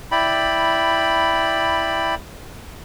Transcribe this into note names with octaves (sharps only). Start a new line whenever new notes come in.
E4 D5 G5 B5